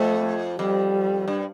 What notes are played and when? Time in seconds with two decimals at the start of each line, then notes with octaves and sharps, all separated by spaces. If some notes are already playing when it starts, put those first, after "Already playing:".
Already playing: F2 A3
0.59 F2 G3
1.28 G2